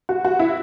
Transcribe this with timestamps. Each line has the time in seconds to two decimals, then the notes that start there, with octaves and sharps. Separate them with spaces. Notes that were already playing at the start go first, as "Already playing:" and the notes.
0.09 F#4
0.25 F#4
0.39 E4